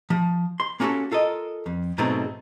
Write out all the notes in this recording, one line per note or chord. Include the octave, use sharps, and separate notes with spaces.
F3
C6
A#3 C#4 F#4 G4 A4
F4 A4 A#4 D#5
F2
G#2 B2 F#3 A3 C4 D#4